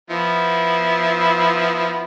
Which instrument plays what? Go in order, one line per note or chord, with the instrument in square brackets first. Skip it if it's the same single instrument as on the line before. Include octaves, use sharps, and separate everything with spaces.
[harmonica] F3 B3 E4